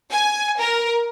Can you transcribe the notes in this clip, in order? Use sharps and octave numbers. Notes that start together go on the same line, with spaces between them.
G#5
A#4